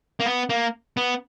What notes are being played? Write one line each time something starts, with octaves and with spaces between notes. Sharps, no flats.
A#3
B3
A#3
B3